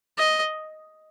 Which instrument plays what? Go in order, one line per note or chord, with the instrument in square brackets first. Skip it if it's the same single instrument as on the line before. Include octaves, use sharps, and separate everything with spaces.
[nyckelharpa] D#5